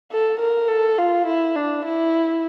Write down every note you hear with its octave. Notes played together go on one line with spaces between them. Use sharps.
A4
A#4
A4
F4
E4
D4
E4